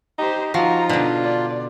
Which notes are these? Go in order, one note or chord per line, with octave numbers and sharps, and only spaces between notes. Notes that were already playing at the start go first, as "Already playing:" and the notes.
D#4 G4 C5
F3 D#4 F4 F#4 A#5
B2 D3 D4
D5